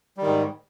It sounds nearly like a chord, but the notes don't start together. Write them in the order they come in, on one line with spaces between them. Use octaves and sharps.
G3 D#3 G#2